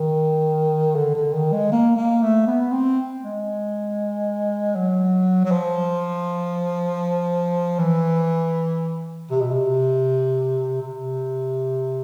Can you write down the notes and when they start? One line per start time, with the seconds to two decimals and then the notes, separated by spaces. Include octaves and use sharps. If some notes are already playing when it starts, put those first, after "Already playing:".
Already playing: D#3
0.95 D3
1.15 D3
1.33 D#3
1.52 G#3
1.71 A#3
1.96 A#3
2.22 A3
2.47 B3
2.72 C4
3.23 G#3
4.75 F#3
5.44 F#3
5.51 F3
7.79 E3
9.30 C3
9.40 B2
9.50 C3
10.82 C3